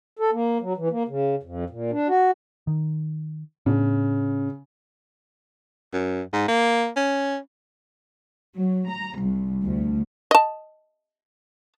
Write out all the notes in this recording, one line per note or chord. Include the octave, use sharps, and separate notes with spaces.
A4
A#3
F#3
E3
A#3
C#3
F2
A#2
D4
F#4
D#3
A2 C#3 B3 D4
F#2
G#2
A#3
C#4
F#3
A#5
C2
D2
D#5 A5